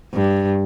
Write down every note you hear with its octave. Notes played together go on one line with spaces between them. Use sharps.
G2